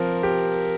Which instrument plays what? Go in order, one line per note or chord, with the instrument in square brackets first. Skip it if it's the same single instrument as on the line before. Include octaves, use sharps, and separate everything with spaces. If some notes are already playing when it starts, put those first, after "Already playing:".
Already playing: [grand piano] F3 C4 [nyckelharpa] A#4
[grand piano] G4